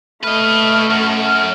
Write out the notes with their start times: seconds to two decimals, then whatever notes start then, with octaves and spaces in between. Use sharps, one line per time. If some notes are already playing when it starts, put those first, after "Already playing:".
0.24 A3 B4 D#5 F6
0.90 F#2 F6